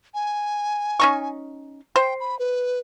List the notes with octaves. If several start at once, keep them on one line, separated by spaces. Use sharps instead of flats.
G#5
C#4 D#4 C#6
C5 G5
B5
B4